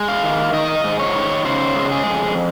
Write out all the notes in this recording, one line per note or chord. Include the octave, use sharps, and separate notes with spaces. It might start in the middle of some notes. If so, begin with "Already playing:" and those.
Already playing: G#3
F5
D#3
D#3 D#5
G#2
C#5
D#3
C#3 C5
G#3
G#4
F2